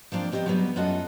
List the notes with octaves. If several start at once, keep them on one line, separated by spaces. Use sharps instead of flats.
F3 A#3 C4 D4
B3 C4 G4 C#5 D#5
F#3 G3 B3
F#2 B3 F4 F#4 A4 D#5